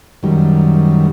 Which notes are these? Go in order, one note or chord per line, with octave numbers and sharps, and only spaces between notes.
F#2 D#3 G3